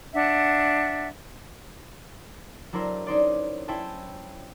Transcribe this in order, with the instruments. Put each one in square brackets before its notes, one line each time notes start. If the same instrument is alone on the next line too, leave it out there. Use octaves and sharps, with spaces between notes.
[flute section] D4 E5 F#5
[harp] F#3 D4 E4 A#4 C5
C#4 D#4 C5 D5
C#4 E4 C5 E5 G5 A5